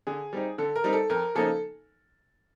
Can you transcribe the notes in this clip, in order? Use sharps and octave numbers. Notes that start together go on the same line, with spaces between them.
D3 G#4
G3 C4 D#4
D3 A4
A#4
G3 C4 D#4
A4
F2 A#4
C#3 F3 A#3 D#4 A4